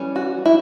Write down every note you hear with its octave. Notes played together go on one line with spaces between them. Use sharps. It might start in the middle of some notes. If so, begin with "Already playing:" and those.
Already playing: E3 G3 C#4
F#4
E4